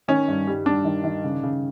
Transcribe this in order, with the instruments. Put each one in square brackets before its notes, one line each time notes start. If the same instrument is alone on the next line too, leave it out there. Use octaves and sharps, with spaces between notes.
[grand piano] D#3 [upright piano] C#4
[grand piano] G2
G3
[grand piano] G3 [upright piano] D4
[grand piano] D#3
D#3
C#3
C#3